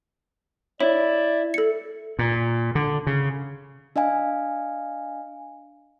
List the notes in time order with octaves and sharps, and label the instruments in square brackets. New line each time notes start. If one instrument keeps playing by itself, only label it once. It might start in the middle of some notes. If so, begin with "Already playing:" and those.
[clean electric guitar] E4 [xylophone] C#5 [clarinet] D5
[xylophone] A4 C#7
[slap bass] A#2
D3
C#3
[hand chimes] D4 D#5 F5 G#5